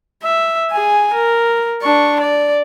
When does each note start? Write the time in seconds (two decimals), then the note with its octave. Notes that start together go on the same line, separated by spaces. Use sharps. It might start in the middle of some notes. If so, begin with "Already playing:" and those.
0.23 E5
0.71 G#4 G#5
1.13 A#4
1.82 D4 C#6
2.20 D5